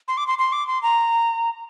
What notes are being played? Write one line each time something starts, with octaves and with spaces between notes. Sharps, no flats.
C6
D6
C6
C6
D6
C6
A#5